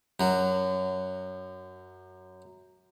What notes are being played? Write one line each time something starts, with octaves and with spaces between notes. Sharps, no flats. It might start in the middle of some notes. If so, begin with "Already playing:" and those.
F#2 F#3